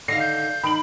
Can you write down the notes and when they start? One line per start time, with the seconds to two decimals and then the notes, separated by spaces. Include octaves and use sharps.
0.08 D3 D#3 F5 A#6 C7
0.20 G6
0.64 D#3 B5 D7 F#7